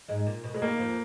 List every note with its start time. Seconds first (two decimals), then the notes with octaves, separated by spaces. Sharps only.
0.08 G#2 G#3
0.27 A#2
0.44 B2
0.54 G#3
0.62 D#2 D#3 A#3
0.79 F2 F3